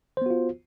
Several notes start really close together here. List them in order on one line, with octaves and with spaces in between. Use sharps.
C5 B3 F#4 F4